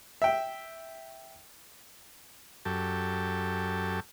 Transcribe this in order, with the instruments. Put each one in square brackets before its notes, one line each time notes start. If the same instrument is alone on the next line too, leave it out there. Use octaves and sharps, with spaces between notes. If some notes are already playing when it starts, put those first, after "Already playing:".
[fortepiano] E5 G5
[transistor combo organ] F#2 G4 A4